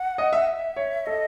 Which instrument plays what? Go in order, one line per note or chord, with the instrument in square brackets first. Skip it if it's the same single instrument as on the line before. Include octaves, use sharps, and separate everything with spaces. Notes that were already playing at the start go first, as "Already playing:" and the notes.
Already playing: [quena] F#5
[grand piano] D#5
E5
[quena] E5
[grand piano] C#5
[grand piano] A4 [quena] D#5